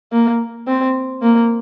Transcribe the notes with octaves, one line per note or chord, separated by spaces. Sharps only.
A#3
C4
A#3